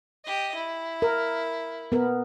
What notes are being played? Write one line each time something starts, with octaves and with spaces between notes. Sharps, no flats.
G4 D#5
E4
A#4
B3 A#4